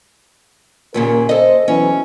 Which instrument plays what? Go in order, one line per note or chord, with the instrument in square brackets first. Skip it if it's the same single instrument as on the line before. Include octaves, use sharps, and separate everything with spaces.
[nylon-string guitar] D#2 A#2 C#3 [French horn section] A#4
[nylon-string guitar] A4 D#5 [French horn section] C5
[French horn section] B2 E3 F#3 [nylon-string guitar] C#4